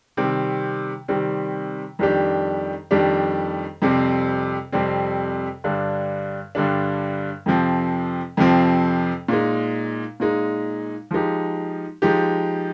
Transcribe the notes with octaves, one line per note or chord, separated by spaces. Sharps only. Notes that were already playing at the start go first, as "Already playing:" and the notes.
C3 D#3 G3 C4
C3 D#3 G3 C4
F2 D#3 G3 D4 G4
F2 D#3 G3 D4 G4
F2 C3 G3 C4
F2 C3 G3 C4
G2 D3 G3 D4
G2 D3 G3 D4
F2 C3 F3 C4
F2 C3 F3 C4
A#2 G#3 D#4
A#2 G#3 D#4
F3 G#3 D#4 G4
F3 G#3 D#4 G4